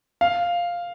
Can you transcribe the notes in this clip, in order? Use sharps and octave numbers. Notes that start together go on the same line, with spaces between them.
F5